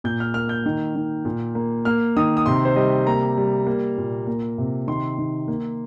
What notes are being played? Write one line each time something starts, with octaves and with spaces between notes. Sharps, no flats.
A#2 G6
F6
A#3 F6
G6
D#3
D#3
A#2
A#3
A#3 F6
D#3 D#6
D#6
C3 C6
C5
G3 D#5
A#3 A#5
G3
A#3
A#2
A#3
C3
D#3 C6
D#3
A#3